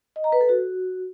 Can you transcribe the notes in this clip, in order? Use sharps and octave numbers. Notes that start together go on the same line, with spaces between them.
D#5
A#5
B4
A4
F#4